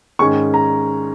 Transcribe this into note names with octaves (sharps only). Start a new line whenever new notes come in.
G#2 D#3 G#3 C#4 C#6
A#5